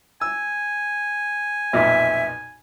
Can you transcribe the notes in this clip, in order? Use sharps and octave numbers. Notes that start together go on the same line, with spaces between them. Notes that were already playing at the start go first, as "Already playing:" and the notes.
G#5 E6
B1 F2 A#2 E5